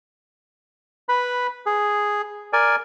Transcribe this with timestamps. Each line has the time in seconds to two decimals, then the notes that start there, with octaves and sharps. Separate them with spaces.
1.09 B4 B5
1.66 G#4
2.53 A#4 D5 G#5